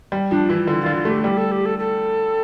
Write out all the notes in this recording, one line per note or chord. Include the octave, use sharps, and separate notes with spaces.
G3
F3 D4
E3 E4
D3
D3 F4
F4
A3 G4
G3 G4
A4
G4
A4
A4